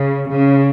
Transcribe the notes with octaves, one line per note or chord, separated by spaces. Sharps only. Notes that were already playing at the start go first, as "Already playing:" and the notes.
Already playing: C#3
C#3